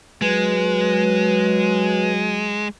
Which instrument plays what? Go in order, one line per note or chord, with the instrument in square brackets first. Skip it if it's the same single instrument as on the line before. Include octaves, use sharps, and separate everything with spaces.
[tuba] F#3 [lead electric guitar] G#3 [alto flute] B4